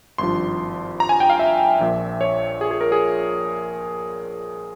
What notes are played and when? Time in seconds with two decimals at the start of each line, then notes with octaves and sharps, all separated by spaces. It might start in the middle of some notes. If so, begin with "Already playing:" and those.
0.18 G#1 G2 F3 C6
1.00 A#5
1.09 G#5
1.20 G5
1.30 F5
1.39 E5
1.80 A#1 A#2 F3
2.21 C#5
2.61 G#4
2.71 G#4
2.81 A#4
2.92 G#4